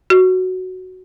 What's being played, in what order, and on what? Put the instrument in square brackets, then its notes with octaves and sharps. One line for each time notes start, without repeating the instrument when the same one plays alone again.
[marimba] F#4